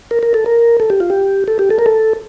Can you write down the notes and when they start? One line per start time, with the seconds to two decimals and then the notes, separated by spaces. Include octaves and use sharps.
0.11 A#4
0.23 A#4
0.34 A4
0.46 A#4
0.80 A4
0.90 G4
1.00 F4
1.10 G4
1.48 A4
1.59 G4
1.70 A4
1.79 A#4
1.86 A4